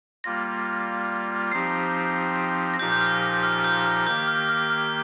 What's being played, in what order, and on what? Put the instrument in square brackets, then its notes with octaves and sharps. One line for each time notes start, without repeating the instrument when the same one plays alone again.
[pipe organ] G3 A#3 F4 [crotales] A#6
[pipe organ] F3 C4 D#4 G4 [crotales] C7
[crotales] A#6
[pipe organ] A#2 F3 D#4 G4 [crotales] G6
[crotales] G6
F6
F6
F6
G6
F6
[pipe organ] D#3 A#3 G4 [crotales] G6
[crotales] F6
F6
F6